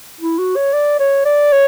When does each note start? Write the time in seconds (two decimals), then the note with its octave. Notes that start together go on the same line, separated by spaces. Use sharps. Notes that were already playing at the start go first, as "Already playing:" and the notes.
0.21 E4
0.39 F#4
0.56 C#5
0.73 D5
1.00 C#5
1.25 D5
1.52 C#5